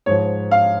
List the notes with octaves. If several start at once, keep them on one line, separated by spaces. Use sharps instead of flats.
G#2 F3 C#5
F5